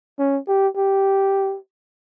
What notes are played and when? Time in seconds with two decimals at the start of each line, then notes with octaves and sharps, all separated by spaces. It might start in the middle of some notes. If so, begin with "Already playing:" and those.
0.19 C#4
0.48 G4
0.77 G4